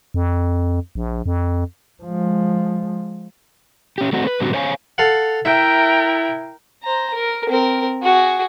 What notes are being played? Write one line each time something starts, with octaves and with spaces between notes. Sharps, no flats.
F2
A#1
F2
F3 G#3
C#4 G4
A3 C4 F#4
B4
A2 D3 G3 C4 D#4 F#4
C5 C#5 F5 G#5
A4 F5 F#5
E4 A#4 E5 G5
C5 A#5
A#4
C4 A#4
F#4 G#4